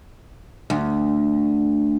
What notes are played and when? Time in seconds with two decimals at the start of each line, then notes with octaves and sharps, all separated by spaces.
0.70 D2